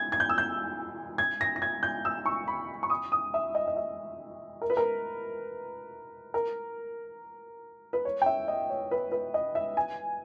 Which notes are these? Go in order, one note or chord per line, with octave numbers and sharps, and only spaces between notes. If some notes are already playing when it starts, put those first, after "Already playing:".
Already playing: G#6
G#6
G6
E6
G6
G#6
A#6
A#6
G#6
G6
E6
C#6
B5
C#6
D#6
D#6
E5
D#5
D#5
E5
A#4
B4
A#4
A#4
B4
C#5
G5
E5
D#5
C#5
B4
B4
D#5
E5
G#5